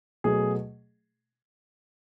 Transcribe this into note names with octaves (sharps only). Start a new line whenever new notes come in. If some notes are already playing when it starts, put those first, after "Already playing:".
B2 F#3 A3 G#4